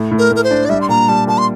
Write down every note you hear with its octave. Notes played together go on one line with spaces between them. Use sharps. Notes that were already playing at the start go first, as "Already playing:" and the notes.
Already playing: A2
A2
A#4
A2 A#4
C5
D4
D5
G3 E5
C6
A#2 A#5
G3 A5
A#2 A5
C6